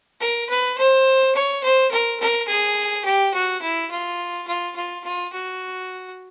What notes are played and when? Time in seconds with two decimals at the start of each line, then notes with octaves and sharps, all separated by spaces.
0.20 A#4
0.49 B4
0.78 C5
1.35 C#5
1.63 C5
1.91 A#4
2.20 A#4
2.48 G#4
3.05 G4
3.34 F#4
3.61 E4
3.91 F4
4.48 F4
4.76 F4
5.04 F4
5.32 F#4